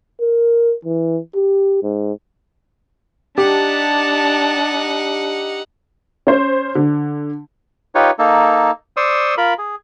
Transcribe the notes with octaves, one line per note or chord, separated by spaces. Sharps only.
A#4
E3
G4
G#2
D4 D#4 G4 F#5 A5
C#4 C5
D3
D#4 F4 G4 B4 C#5
A#3 D#4 A4
C5 D5 C6 C#6 D#6 E6
F4 A#4 B5
G#4